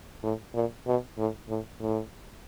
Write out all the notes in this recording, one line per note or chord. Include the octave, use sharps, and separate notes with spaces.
A2
A#2
B2
A2
A2
A2